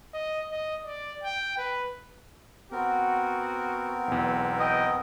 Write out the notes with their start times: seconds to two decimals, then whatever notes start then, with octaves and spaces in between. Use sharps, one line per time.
0.14 D#5
0.51 D#5
0.85 D5
1.24 G5
1.58 B4
2.72 B3 C4 F#4 A#4
4.08 B1 E2
4.60 D#5 G5